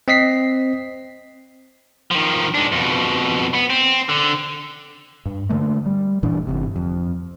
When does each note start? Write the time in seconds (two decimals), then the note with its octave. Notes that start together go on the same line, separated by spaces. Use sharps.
0.08 C4 D#5 B6 C7
2.11 D#3 F3
2.55 G#3 D4
2.72 F2 B2
3.54 B3
3.70 C4
4.09 D3
5.26 G2
5.49 D3 A3 A#3
5.86 G3
6.23 A1 A#2 E3 D4
6.47 G1 C3
6.76 F2